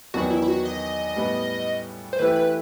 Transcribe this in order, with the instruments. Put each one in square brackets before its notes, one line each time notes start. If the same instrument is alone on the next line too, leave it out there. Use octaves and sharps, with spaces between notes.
[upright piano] E2 D#3 F#3 B3 [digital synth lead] F#4
[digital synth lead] E4
E4
F#4
D#5
[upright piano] A2 G3 B3
[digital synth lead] C5
[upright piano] E3 A3 E4 G4 [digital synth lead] B4
[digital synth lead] B4